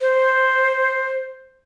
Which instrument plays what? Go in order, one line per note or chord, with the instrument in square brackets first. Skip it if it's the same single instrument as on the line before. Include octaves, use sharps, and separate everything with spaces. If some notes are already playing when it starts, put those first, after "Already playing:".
[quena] C5